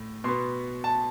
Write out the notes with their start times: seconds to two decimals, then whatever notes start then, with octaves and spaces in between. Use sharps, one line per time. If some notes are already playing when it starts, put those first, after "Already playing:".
Already playing: A2
0.24 B2 B3 C6
0.84 A5